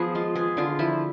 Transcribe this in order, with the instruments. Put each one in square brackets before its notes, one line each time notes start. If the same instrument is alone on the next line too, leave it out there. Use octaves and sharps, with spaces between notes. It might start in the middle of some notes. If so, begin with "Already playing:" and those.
Already playing: [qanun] F3 B3 G#4
G#3 F4
B3 G#4
D3 F4
F3 E4